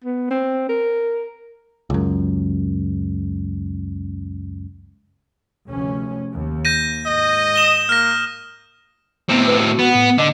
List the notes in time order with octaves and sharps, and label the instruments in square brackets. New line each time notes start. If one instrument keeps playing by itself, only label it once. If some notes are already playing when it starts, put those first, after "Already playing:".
[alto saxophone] B3
C4
A#4
[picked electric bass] C#2 F#2
[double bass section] F1 D2 C#4
D#2
[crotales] G6 A#6 D#7
[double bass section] G#2 [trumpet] D#5
[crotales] D#6 E7 G7
[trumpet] A#3 [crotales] F6 A#6
[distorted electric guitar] A2 C4 [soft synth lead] B3
[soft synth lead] B4
F#4
[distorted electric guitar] B3
[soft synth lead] A2
[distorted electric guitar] D3 [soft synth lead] D#5